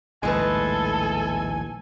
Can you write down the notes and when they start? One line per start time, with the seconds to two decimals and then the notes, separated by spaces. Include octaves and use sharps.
0.23 A#1 D#2 A2 G#3 A3 A4 B4 G#5